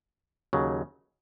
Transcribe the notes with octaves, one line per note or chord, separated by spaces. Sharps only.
D#2 C#3 F#3